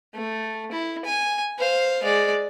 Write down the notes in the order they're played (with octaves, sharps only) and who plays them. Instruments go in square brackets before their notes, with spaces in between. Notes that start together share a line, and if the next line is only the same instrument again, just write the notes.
[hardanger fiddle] A3
E4
G#5
C5 F5
G#3 D5